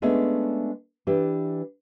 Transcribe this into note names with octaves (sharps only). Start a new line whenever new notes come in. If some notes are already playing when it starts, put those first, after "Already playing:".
G#3 A3 B3 C#4 D4 G#4
E3 D4 G4 B4